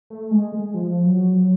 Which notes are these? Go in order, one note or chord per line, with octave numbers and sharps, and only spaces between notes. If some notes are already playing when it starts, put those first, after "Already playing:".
A3
G#3
G#3
F3
F#3